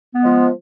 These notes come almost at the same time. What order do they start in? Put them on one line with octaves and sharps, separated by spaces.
B3 G#3 F3